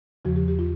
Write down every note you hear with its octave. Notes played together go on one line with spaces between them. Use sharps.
E2 C#3 F3 F#4
G4
G4
F4